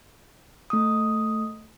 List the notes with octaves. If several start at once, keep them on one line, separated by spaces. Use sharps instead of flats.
A3 D#6